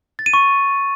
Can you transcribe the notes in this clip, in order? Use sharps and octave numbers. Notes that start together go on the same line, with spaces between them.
A6
D#7
C#6